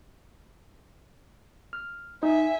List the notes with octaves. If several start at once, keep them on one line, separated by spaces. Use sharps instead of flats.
F6
D#4 E5 G#5